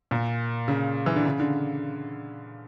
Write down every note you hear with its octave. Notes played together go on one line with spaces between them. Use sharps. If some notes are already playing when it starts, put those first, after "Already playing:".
A#2
C#3
E3
D3
C#3
D3